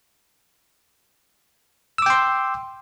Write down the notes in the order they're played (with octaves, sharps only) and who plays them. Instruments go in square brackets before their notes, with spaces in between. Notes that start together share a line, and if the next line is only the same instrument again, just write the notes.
[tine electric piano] E6
D6
G5
C6